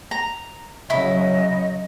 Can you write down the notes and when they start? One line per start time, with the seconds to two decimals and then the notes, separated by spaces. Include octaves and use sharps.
0.11 A#5
0.90 C#3 F#3 E4 D#5 B5